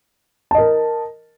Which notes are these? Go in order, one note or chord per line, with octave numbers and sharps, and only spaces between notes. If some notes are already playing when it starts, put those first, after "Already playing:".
A#4 D#5 A5